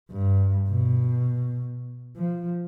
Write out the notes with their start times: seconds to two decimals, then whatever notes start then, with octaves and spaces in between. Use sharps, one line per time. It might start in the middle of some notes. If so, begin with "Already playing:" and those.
0.11 G2
0.69 B2
2.16 F3